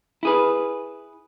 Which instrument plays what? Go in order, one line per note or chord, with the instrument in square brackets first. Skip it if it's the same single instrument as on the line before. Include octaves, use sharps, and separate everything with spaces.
[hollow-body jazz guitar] E4 G#4 B4